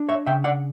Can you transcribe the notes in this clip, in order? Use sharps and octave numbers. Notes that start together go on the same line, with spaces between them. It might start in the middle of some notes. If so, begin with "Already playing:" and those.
Already playing: D4
C#5 E5
C#3 E5 G5
D5 F#5